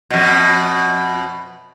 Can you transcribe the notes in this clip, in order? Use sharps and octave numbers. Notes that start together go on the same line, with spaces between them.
F2 B2